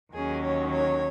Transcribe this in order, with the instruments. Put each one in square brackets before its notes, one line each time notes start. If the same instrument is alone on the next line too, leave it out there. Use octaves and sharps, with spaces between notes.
[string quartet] D#2 D#3 F#3 C#4 G#4
C#5
C#5